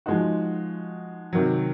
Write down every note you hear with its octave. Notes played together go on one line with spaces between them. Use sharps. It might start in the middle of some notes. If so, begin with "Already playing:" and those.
F3 G#3 D#4 F#4
C3 D#3 F#3